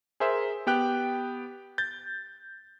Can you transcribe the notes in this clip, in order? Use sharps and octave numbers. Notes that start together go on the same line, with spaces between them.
G#4 A#4 C5 E5
B3 G4 G5 F#6
G6 A6